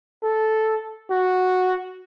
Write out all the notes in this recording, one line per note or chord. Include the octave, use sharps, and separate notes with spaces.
A4
F#4